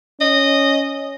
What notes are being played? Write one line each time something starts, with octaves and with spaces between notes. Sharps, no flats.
C#4 D#5